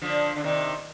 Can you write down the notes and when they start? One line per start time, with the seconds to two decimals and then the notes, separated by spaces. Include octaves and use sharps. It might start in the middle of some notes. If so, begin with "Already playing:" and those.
0.02 D3 F3
0.36 D3
0.44 C3 D#3